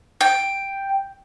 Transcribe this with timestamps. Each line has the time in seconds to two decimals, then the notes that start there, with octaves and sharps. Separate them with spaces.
0.21 G5